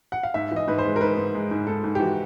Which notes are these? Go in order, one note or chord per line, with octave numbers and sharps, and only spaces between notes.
F#5
F5
G#2 E5
E3 D#5
G#2 B4
C5
G#3
A#4
G#2 B4
G#2
G#3
G#2
G#2 A4
G#2
G4
E3 F#4